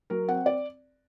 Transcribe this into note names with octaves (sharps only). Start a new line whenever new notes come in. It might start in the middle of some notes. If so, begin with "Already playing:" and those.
F#3 A#4
C4 F#5
D5